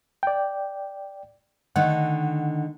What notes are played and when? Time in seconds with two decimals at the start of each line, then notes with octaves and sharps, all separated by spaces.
0.23 D5 G5
1.76 D3 D#3 A3 F#5